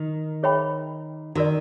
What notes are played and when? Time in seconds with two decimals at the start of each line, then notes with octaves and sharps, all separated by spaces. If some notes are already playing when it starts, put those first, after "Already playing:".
Already playing: D#3
0.43 G#4 C#5 E5 G5 B5
1.35 D#3 F#4 A#4 D5